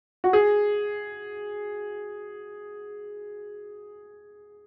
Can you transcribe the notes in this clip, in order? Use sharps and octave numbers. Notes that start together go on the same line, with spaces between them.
F#4
G#4